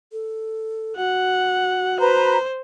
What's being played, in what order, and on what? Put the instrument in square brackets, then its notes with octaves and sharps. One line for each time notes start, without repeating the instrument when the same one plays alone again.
[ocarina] A4
[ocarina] F#4 [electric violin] F#5
[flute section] B4 A#5 [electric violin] C5